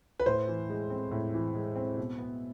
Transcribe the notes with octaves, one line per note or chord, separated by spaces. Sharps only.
B4
A2 C5
E3
G#3
C4
A2
E3
G#3
C4
B2
B3